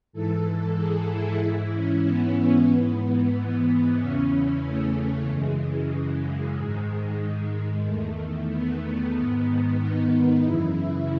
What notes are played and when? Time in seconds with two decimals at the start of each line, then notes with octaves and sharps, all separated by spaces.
0.13 G#2 E3 A4
0.77 G#4
1.09 E4
1.42 G#2 E3 E4
1.73 C#4
2.06 B3
2.71 G#2 E3
3.99 E2 C#3 E3 C#4
4.64 A3
5.28 F#2 C#3 E3 G#3
5.93 G#3
6.58 G#2 D#3
7.86 E2 D#3 A3
8.50 B3
9.14 G#2 D#3 B3
9.79 D#4
10.44 F#2 C#3 E3 E4